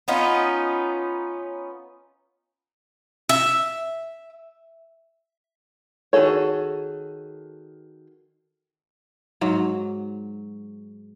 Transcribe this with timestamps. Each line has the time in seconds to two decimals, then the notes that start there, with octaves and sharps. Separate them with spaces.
0.08 B3 C#4 D#4 F4
3.29 E5
6.13 D#3 F#4 G#4 A4 C#5
9.41 G#2 F#3